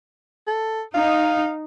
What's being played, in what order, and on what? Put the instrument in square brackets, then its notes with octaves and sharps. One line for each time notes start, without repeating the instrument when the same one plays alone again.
[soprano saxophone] A4
[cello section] D#4 [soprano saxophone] F5